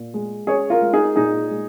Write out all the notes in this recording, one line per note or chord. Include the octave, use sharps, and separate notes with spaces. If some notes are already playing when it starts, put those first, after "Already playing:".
Already playing: A#2
G#3
C#4 G#4 C#5
F4 A#4
G#3
D#4 G#4
A#2 D#4 G#4
G#3